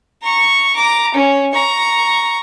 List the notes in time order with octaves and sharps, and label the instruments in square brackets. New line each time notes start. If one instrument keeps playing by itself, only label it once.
[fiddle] A#5 C#6
A#5 D6
C#4
A#5 C#6